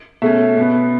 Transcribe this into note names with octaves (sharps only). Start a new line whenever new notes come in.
B2 A3 C#4 E5
B2 B3